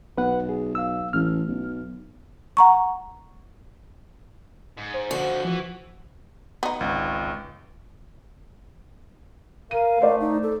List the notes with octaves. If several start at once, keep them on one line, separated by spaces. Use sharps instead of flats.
B1 B4 F#5
G#4
F5 E6
A1 F6
B1
F#5 A#5 C#6
G#2
C5
D3 F3 F#4
E3 F3
B3 D#4
G#1 C#2
A#4 F5 D#7
A3 A#4 C5 D5
D#4
A4